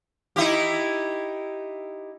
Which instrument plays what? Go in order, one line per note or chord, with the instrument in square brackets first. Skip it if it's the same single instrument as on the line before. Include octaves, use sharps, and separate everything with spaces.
[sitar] D#4 E4 G4